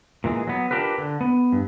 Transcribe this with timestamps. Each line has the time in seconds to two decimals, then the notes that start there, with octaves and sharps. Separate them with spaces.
0.24 A#2 E3 G#3
0.47 F#3 B3
0.71 D4 F4 G4 A#4 B4
0.98 D3
1.21 B3
1.52 G2